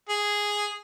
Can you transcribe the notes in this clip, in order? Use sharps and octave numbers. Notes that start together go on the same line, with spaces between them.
G#4